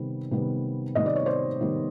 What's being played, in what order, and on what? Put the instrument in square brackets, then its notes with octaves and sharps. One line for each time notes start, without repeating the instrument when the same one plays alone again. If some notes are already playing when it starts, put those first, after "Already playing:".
Already playing: [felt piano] C3 D#3 G3 B3
C3 D#3 G3 B3
C3 D#3 G3 B3 D#5
D5
C#5
C5 D5
C3 D#3 G3 B3